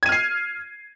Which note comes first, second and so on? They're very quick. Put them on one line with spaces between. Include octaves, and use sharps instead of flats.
G#6 D#7 F6 C7